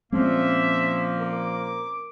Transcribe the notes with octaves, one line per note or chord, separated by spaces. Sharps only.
A#2 F3 G#3 A#3 C4 C#4 E5
A#4 D6